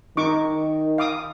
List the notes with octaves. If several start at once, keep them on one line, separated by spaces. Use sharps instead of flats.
D#3 D#4 C#6 D6
F5 D6 D#6